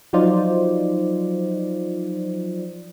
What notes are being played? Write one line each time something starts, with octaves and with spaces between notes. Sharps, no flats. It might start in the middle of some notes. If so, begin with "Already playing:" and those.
F3 F#3 D#4 F4 C5 D5